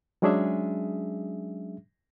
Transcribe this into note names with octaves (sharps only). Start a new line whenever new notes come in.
F#3 G#3 C#4 D4 G#4 E5